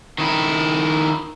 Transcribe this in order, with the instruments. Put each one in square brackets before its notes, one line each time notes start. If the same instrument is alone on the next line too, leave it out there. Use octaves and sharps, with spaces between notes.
[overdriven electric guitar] D#3 E4